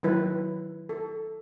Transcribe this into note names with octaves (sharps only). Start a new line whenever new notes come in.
D#3 F#3 E4 B4
A4